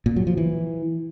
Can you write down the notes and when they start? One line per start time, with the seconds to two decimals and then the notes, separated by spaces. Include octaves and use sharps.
0.06 A#2
0.16 F#3
0.27 F3
0.37 E3